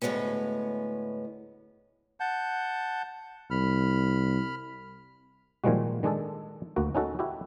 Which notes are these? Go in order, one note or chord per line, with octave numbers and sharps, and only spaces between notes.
D2 A2 F3 G#3 B3 C#4
F#5 A5 G6
C2 B5 F6
A#2 D#3 F3 G3 G#3 F#4
D#3 G#3 D4 G#4 A4
D2 A#3 F#4
C#4 D#4 F#4 A4
E4 F#4 G4